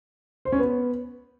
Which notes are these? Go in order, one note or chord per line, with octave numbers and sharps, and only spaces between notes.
C5
C#4
B3